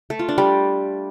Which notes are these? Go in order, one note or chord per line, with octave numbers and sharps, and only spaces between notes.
A3
F4
D4
G3